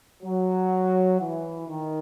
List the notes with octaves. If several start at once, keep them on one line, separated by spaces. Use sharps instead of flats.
F#3
E3
D#3